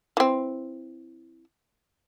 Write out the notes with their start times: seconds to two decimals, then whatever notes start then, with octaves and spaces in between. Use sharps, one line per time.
0.17 E3 C4